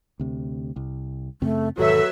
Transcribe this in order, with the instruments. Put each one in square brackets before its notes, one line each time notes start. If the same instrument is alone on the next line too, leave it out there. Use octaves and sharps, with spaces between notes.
[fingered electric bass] D2 C3
C2
[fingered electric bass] F#2 C#3 C4 [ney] A3
[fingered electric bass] E1 G#2 D#3 [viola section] F#3 B4 E5 [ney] A4